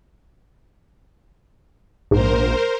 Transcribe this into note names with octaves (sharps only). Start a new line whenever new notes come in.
A#1 G#2 A#4 C5